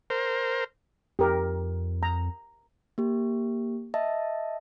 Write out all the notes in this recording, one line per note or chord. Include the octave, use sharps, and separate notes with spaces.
A#4 C5
F2 G4 A#4
A#5
A#3 G4
D#5 E5 A5